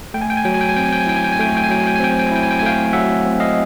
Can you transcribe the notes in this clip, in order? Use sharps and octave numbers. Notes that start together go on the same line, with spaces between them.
A3 G5
G#5
G5
G#5
F#3 G5
G#5
G5
G#5
C4 G5
G#5
G5
G#5
E4 G5
G#5
G5
G#5
A3 G5
G#5
G5
G#5
F#3 G5
G#5
G5
G#5
C4 G5
G#5
G5
G#5
E4 G5
G#5
G5
G#5
A3 F5 G5
F#3 E5 F#5
C4
D#5 F5